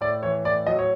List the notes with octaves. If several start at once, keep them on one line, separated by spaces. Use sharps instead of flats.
A2 D5
E3 C#5
A2 D5
F#3 D#5
C#5